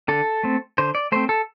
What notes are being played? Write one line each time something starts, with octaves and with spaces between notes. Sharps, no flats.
D3 A4
A3 C4
D3 C5
D5
A3 C4 C5
A4